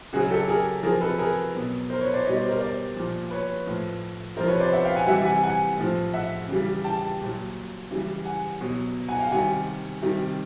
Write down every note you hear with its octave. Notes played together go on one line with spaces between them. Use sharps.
C#3 F#3 F#4 G#4
G4 A4
G#4 A#4
C3 F3 G#4 A#4
A4 B4
G#4 A#4
B2 F#3
A#4 C5
B4 C#5
C5 D5
B2 G3 C#5 D#5
C5 D5
A#4 C5
C5 D5
A#2 F3
B4 C#5
A2 F3
C3 F3 A#4 C5
B4 C#5
C5 D5
E5 F#5
F5 G5
F#5 G#5
C3 E3 G3 E5 F#5
F#5 G#5
F#5 G#5
A2 F3
E5 F#5
C#3 E3 G3
G5 A5
A#2 F#3
C#3 E3 G3
F#5 G#5
B2 F#3
F#5 G#5
F5 G5
C3 D#3 G3 F#5 G#5
C3 D#3 G3